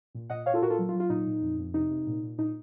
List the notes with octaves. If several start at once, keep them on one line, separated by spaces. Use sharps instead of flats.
A#2
A#2 D#5 F#5
A#2 C#5 F5
F4 A4
A#2 F#4 A#4
F4 A4
F#3
F4
F#3
F4
A#2 D#4
A#2
F2
F2
C3 D#4
C3
A#2
A#2
A#2 D#4